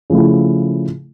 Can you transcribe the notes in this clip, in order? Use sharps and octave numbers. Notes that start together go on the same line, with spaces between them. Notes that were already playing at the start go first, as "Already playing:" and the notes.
C#3 F3 A3 E4